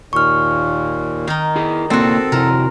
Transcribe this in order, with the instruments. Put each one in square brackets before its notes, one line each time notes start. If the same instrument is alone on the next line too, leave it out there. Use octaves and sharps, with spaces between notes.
[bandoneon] D#2 A#2 [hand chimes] C#6 F6
[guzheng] D#3 D#4
[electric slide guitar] E4 G#4
[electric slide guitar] A#3 E4 D5 [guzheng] C4 F#4 [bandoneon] A4
[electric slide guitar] C3 E4 F#4 [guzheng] A#4